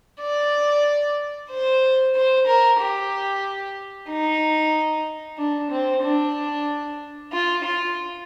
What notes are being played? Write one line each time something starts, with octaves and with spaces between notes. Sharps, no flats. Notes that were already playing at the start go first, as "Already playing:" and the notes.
D5
C5
C5
A#4
G4
D#4
D4
C4
D4
F4
F4